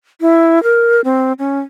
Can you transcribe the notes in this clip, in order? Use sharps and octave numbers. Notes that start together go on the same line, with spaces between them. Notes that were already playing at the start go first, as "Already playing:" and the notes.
E4
A#4
C4
C#4